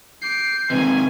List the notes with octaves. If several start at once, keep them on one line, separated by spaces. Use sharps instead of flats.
D6 G6 C7
C3 D#3 E3 G#3 G#5